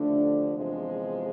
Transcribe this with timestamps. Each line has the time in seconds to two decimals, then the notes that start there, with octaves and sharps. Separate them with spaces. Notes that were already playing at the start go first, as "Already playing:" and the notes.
Already playing: D#2 D3 F3 A3 D4
0.54 E2 C3 F3 G#3